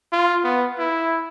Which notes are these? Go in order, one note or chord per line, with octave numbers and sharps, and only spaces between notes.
F4
B3
E4